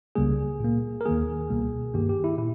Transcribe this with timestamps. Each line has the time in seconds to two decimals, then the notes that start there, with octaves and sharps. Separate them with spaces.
0.15 C#2 C#3 G3 A#3 G#4
0.60 A#2 A#3
1.01 A#4
1.05 D#2 D#3 A#3 G#4
1.50 C#2 B2 G3 A#3
1.94 G2 D#3 A#3 G4
2.09 G4
2.24 E4
2.38 A#2 E4